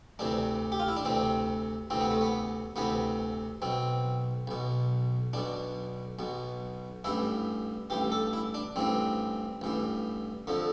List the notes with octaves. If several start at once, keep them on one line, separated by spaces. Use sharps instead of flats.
D2 C3 E3 D4
G4
F4
E4
D4
D2 C3 E3 C4
D2 C3 E3 C4
B3
A3
B3
D2 C3 E3 B3
B1 B2 C4
B1 B2
B1 B2 D4
B1 B2
A1 G2 E3 E4
A1 G2 E3 G4
A4
E4
D4
A1 G2 E3 C4
A1 G2 E3
F2 D3 F3